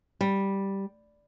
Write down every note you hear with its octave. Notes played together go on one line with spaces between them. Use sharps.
G3